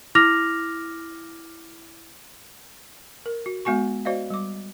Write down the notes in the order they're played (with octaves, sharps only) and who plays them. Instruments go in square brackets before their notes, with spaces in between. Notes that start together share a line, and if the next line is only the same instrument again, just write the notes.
[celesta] E4 D6 F6 A#6 F7
[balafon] A#4
F#4
G#3 B3 F#4 G#5 C#6
F#4 C5 D5 D#5 F5
G3 D6